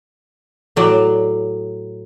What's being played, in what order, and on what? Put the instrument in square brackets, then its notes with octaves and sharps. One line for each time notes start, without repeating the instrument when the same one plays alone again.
[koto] A2 F#3 D5